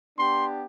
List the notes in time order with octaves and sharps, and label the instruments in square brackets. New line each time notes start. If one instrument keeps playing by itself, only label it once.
[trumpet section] B3 D4 G4 C6